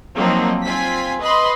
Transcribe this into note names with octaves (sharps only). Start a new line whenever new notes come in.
F3 F#3 A#3 C4 D4 D#4
C4 F4 G#5 B6
B4 D#5 B5 C6